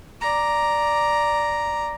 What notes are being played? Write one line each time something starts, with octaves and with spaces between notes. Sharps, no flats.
D5 A#5